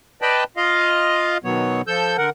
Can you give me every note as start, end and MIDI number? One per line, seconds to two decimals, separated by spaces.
0.22 0.44 71
0.22 0.44 74
0.22 0.44 75
0.22 0.44 79
0.22 0.44 81
0.22 0.44 83
0.57 1.38 65
0.57 1.38 75
0.57 1.38 77
1.44 1.82 47
1.44 1.82 51
1.44 1.82 54
1.44 1.82 59
1.44 1.82 73
1.87 2.17 53
1.87 2.17 69
1.87 2.17 88
1.87 2.17 91
2.18 2.30 50
2.18 2.30 70
2.18 2.30 78